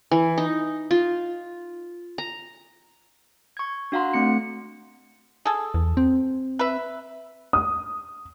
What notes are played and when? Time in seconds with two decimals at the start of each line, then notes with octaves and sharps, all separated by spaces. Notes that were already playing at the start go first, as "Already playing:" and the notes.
0.11 E3
0.38 D#4
0.91 F4
2.18 A#5
3.57 C#6 G#6
3.92 D4 F#4 F5 F#5 A#5 C6
4.14 A3 C4 C#7
5.45 G#4 A4
5.74 E2
5.97 C4
6.59 B4 E5
7.53 D#6